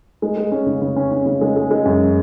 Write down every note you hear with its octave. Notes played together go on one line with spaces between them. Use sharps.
G#3
G#3
C#4
C#3
C#3
C#4
C#4
C#3
G#3
G#3
G#3
F#2